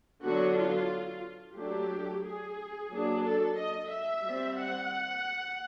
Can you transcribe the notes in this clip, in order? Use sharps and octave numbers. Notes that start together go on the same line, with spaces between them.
D3 F#3 B3 D4 F#4
F4
F#3 A3 D4 G4
G#4
F#3 A#3 D4
A4
D#5
E5
G3 C4
F#5